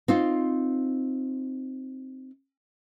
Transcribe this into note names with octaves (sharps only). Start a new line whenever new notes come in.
C4 D#4 F4